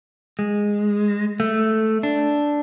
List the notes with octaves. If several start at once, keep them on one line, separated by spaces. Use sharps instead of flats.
G#3
A3
D4